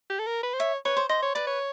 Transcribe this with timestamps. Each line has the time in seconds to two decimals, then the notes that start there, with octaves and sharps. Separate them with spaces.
0.10 G4
0.19 A4
0.27 A#4
0.43 B4
0.54 C5
0.59 C#5 E5
0.85 B4 C#5
0.97 C5
1.09 C5 D#5
1.22 C#5
1.35 B4 D5
1.47 C#5